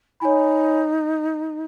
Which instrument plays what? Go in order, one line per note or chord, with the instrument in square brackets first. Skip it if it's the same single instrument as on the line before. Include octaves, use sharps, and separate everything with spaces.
[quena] D#4 E4 [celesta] C#5 G#5 B5